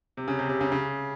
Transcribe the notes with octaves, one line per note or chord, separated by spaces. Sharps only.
C3
C#3
C3
C3
C#3
C#3